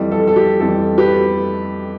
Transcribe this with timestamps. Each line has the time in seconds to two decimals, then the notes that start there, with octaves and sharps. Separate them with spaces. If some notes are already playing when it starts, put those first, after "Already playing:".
Already playing: F2 E3 G3
0.11 A4
0.27 A4
0.36 G4
0.60 F2 E3 G3 A4
0.98 G4 B4